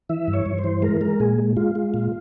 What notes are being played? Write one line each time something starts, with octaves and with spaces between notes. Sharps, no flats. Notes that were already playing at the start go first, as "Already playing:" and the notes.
E3 E5
G2
C#5
G2
C5
E3
G#3 A#4
G#3 A#4
A#2 G#4
G#3
G#3 F4
G#3
A#2